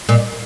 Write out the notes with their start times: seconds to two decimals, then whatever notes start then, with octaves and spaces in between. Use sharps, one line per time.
0.09 A#2